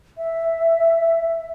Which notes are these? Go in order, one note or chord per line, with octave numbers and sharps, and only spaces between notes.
E5